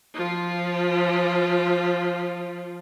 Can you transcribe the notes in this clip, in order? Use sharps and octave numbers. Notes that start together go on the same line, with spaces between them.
F3 F4